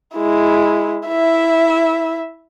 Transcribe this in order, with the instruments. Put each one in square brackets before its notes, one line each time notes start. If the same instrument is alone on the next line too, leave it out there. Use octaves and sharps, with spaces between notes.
[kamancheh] G#3 E4
E4 E5